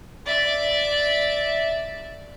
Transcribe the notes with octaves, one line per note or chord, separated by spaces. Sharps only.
D5 E5